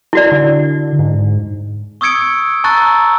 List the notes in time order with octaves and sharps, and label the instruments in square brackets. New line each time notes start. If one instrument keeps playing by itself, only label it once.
[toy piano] E4 F#4 D5
[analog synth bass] D3
G#2
[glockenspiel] C#6 D#6 E6 G#6 C#7 D7
A5 A#5 C#6 E6 F#6 A6